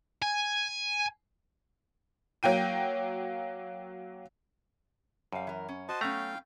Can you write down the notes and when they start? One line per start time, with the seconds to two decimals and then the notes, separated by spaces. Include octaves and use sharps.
0.22 G#5
2.43 F#3 A#3 G5 D#7
5.32 F#2 G3 F5
5.47 E3 A#4
5.69 C#4
5.89 F#4 C5 D#5 A5
6.01 F#3 A3 B3 C#4 F5 G5 A#5